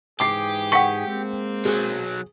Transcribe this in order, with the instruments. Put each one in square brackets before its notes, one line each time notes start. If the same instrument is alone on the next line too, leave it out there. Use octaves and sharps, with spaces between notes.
[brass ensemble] G#2 E3 G#4 [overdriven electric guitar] G4 [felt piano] D6 C7
[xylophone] F#5 C#6 [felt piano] G5 B6 C#7
[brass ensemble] G#3 A#3 C4
[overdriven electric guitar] B1 F#3 [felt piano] G#4